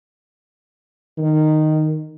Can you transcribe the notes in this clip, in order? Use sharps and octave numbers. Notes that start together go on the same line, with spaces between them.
D#3